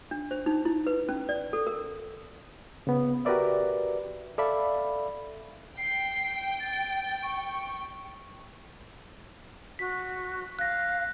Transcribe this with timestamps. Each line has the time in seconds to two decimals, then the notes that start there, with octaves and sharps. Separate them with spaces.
0.11 D4
0.31 C5
0.46 D#4
0.65 E4
0.87 B4
1.09 C#4
1.29 D5
1.53 A4
1.67 A#4
2.87 C#3 B3
3.25 F#4 G4 A#4 B4 D5 E5
4.38 A4 D5 E5 F5 B5
5.78 G5 C7
6.60 A6
7.23 C#6
9.79 F#4 B6
10.59 F5 F#6 A#6